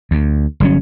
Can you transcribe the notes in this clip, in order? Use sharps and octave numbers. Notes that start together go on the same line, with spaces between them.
D2
G1 F#3 C#4